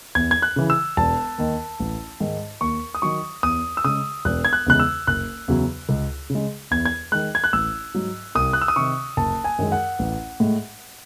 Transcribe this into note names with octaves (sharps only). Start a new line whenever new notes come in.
E2 G#6
G#6
F#6
C#3 E3
E6
E1 A5
D#2 D#3
A1
G#2 D#3 G#3
D#2 C#6
D#6
D#3 F#3 C#6
E2 D#6
E6
C#3 G#3 D#6
E1 F#6
G#6
F#6
E2 C#3 G#3 F#6
E6
F#1 F#6
E2 C#3 F#3
C#2
C#3
G#3
E2 G#6
G#6
D#3 G#3 F#6
G#6
F#6
A1 E6
G#2 F#3
C2 D#6
F#6
E6
D#6
C3 D#3 C#6
F#1 A5
G#5
F#2 D#3 G#3
F#5
A1
A2 G#3